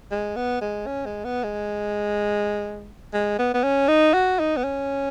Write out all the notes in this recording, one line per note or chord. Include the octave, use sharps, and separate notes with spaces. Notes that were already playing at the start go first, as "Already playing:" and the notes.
G#3
B3
G#3
C#4
G#3
B3
G#3
G#3
B3
B3
C#4
D#4
F#4
D#4
B3
C#4